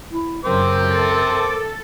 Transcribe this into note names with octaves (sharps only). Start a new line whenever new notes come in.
E4
F#2 C#3 F#3 C4 A#4 C5 D6
A4